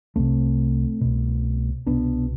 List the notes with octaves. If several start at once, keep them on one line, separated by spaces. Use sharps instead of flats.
C2 C3 A3 C4
C2 B2
C2 B2 B3 D4